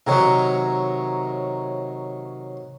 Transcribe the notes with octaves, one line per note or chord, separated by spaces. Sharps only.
C3 D#3 F#3 C#5 G#5 A#5